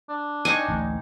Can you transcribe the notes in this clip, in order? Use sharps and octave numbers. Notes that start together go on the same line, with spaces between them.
D4
A#3 C4 D#4 G#5 C#6
A1 D2